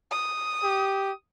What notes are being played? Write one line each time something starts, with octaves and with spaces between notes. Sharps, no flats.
D#6
G4